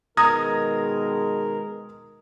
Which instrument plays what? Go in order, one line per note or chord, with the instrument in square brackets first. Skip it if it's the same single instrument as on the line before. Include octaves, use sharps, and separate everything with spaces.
[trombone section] B2 D#3 G#3 [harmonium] A#4 [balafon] A#5 [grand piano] D#6 G#6 A#6